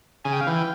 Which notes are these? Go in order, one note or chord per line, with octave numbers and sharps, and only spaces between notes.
C#3 G#5
G5
F5
E3 G5